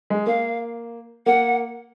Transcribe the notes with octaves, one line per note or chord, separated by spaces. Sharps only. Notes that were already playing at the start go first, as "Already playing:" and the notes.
G#3
A#3 F5
A#3 F#5